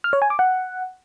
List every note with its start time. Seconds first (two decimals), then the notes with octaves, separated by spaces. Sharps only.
0.04 F6
0.13 C#5
0.22 G#5
0.30 D6
0.39 F#5